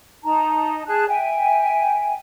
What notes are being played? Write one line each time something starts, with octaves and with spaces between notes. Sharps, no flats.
D#4 A5 A#5
G#4 A5 F#6
E5 G5 G#5